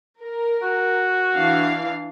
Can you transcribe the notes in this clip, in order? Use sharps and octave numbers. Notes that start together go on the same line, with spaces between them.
A#4
F#4
E3 D4 F5